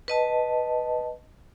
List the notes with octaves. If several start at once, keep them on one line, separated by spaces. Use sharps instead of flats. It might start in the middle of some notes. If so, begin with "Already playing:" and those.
B4 D#5 A5